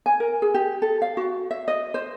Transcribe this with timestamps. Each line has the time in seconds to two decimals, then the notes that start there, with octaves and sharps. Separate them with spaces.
0.06 G#5
0.20 A#4
0.42 G#4
0.54 G4
0.82 A4
1.02 F5
1.17 F#4
1.51 E5
1.68 D#5
1.94 C5